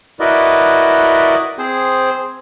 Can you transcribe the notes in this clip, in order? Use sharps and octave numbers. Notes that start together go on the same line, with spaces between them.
E4 F#4 A#4 B4 D5 D#5
C4 G#4 C5